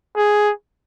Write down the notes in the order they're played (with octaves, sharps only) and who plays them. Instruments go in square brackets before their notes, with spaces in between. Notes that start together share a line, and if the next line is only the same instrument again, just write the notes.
[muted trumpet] G#4